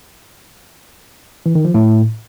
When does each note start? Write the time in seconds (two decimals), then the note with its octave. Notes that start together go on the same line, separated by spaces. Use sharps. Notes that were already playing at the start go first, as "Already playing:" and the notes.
1.46 E3
1.55 D#3
1.65 F3
1.74 A2